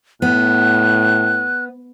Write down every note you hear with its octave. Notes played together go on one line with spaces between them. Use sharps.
A2 B3 F#6